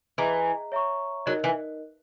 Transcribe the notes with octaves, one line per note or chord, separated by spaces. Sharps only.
E3 G#4 D#5 A#5
C#5 E5 A#5 C#6
F#3 D#4 A#4 D#5
E3